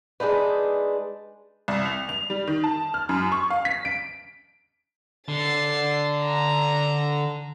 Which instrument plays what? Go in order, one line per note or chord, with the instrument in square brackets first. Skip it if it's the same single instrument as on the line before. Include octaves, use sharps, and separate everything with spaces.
[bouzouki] G#3 D4 D#4 B4
[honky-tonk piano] C2
F7
F7
G3
D#3
A5
F6
F#2
C#6
F5
B6
D7
[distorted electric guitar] D3 [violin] A6 C7
[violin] A#5